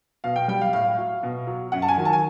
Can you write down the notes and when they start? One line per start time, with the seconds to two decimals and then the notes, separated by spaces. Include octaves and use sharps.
0.24 B2 F5
0.36 G5
0.48 G3 G5
0.61 F5
0.73 A2 F5
0.98 F#3
1.23 B2
1.47 F#3
1.72 F#2 F#5
1.82 A5
1.88 G#5
1.97 D#3 F#3
2.05 A5
2.13 G#5